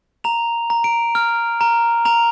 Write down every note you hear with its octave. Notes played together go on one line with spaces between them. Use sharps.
A#5 F7
A#5
D7
F6
A#5
A#5 F7